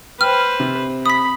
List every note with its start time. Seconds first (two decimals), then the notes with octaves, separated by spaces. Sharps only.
0.21 B4 C5 G5 F6
0.60 C3
1.06 B5 D#6 B6